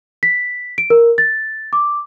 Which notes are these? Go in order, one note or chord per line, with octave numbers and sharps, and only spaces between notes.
B6
D7
A#4
A6
D6